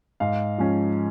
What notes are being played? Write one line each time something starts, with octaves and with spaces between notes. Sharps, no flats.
G#2 F5
F3 G#3 C#4